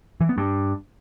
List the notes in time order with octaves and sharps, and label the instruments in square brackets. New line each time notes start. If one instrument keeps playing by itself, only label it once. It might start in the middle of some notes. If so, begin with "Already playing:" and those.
[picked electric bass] E3
B3
G2